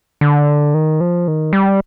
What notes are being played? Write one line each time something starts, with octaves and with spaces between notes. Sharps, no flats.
D3
D#3
F3
D#3
G3